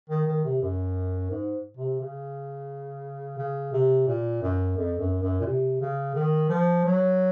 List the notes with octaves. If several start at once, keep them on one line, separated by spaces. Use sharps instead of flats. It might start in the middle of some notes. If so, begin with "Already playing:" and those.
D#3
D#3
C3
F#2
G#2
C3
C#3
C#3
C3
A#2
F#2
F2
F#2
F#2
A#2
C3
C#3
D#3
F3
F#3